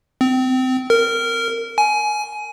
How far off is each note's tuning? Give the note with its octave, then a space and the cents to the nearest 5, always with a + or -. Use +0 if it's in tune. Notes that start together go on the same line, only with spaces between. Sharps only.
C4 -25
A#4 -15
G#5 +20